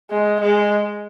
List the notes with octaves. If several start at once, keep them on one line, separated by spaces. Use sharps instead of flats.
G#3
G#3